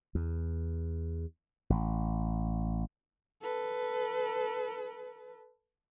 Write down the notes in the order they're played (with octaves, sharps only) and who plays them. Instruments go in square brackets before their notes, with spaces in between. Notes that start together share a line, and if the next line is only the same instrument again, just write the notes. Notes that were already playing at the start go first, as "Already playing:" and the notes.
[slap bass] E2
A1
[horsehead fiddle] A4 B4